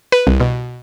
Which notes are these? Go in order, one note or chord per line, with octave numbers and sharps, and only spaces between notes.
B4
C2
B2